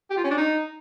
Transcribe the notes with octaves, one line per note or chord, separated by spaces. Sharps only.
G4
F4
C#4
D4
D#4